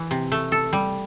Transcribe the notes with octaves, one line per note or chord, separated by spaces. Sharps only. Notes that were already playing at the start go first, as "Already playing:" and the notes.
Already playing: E3
C3
A3
A4
G3